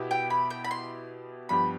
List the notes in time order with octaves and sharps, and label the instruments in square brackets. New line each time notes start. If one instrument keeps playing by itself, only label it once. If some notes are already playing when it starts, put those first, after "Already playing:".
Already playing: [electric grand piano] B2 B3 E4 G4
[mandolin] G5
B5
G5
B5
C6
[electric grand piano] G2 F3 B3 D4 G4 [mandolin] B5